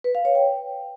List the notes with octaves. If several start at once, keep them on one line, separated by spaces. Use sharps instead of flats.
B4
F5
C#5
G5